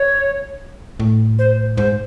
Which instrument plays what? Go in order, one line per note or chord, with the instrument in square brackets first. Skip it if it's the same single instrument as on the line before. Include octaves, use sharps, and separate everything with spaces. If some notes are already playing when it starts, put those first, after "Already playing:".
Already playing: [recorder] C#5
[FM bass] A2
[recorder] C5
[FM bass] G#2 [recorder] C5